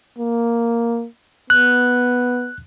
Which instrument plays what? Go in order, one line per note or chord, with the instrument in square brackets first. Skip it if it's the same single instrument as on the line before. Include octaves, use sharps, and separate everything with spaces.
[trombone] A#3
[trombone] B3 [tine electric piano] F#6